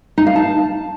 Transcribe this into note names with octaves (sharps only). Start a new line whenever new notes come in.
D#4
F5
A5